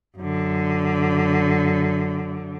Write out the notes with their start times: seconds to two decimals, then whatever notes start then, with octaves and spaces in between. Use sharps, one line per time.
0.18 F#2 D3